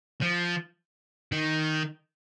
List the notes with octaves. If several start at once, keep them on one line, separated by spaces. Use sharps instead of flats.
F3
D#3